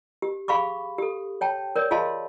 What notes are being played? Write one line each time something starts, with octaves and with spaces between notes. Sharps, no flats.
G4
G#4 F5 B5 C#6 D6
G4 A4
C#5 G5 A5
A#4 C#5 D5
F4 G#4 D#5 F5 A5 C6